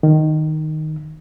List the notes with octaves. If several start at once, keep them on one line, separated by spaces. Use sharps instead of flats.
D#3